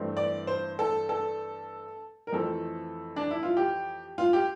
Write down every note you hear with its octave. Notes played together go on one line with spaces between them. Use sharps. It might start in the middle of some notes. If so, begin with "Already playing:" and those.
Already playing: G2 E3 A3 C4
D5
C5
A4
A4
A#4
F2 E3 A3 C4 A4
D4
E4
F4
G4
F4
G4